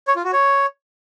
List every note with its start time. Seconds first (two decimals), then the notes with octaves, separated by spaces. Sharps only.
0.08 C#5
0.16 F4
0.24 F#4
0.33 C#5